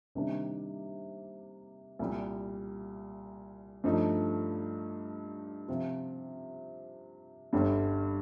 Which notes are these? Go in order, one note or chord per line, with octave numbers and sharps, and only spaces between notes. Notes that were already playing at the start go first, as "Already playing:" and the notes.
C3 D#3 G3 A#3 D4
C2 A#2 G3
G2 F3 A3 D#4
C3 F3 C4 F4
G1 G2 D3 G3